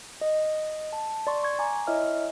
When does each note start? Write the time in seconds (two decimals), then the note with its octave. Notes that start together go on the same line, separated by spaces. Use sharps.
0.21 D#5
0.93 A5
1.27 D5 C6 C#6
1.44 C#6 G#6
1.59 G#5 A#5 D6
1.87 E4 C#5 D#5 E5 F6